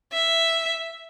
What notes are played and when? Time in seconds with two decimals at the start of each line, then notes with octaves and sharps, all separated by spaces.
0.12 E5